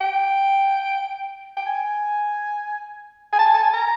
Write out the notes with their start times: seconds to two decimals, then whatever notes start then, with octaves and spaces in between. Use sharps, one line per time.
0.01 G5
1.57 G5
1.66 G#5
3.32 G#5
3.39 A5
3.46 G#5
3.54 A5
3.63 G#5
3.73 A#5